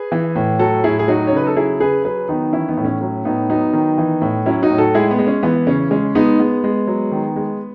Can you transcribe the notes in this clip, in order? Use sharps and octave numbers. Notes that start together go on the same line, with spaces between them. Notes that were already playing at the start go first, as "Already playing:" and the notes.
Already playing: G#4 B4
E3
A2
F#3 F#4 A4
A2 E4 G#4
G#4
F#3 D#4 F#4
C#5
C#3 B4
A4
F#3 E4 G#4
C#3 G#4 B4
F#3 G#4 B4
D#3 B3 D#4
E3 C#4 E4
B3 D#4
A2
C#4
F#3 C#4
A2 B3 D#4
F#3 B3 D#4
D#3
E3
A2
F#3 C#4 E4
D#4 F#4
A2
F#4 A4
G#3 E4 G#4
B3
G#3
C#4
E3 B3
C#3 C#4
G#3 C#4
G#3 B3 D#4
G#3 B3
G#3
F#3
D#3
G#3